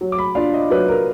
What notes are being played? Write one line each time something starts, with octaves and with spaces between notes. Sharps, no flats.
F#3
D6
B5
D4 F4 F5
D#5
F#3 B4
A#4